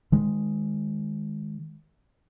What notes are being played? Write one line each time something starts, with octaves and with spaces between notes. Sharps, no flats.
D#3 G#3